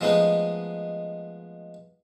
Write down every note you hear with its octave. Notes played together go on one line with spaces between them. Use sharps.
F3 G#3 A3 B3 D#4